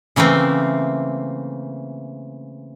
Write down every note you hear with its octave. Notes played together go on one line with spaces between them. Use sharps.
C#3 E3 A3 A#3 C4